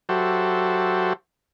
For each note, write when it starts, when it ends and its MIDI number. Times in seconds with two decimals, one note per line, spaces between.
0.09 1.13 54
0.09 1.13 66
0.09 1.13 67
0.09 1.13 69
0.09 1.13 72
0.09 1.13 76